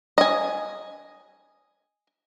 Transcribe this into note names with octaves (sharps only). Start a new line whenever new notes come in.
D#5 G#5